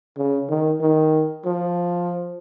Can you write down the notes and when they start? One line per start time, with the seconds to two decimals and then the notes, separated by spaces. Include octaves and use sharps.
0.18 C#3
0.50 D#3
0.81 D#3
1.45 F3